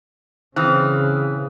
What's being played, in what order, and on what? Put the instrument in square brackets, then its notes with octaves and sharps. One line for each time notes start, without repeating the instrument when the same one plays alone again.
[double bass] C#3 [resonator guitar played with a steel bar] E3 C4 [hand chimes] D#6 F6 F#6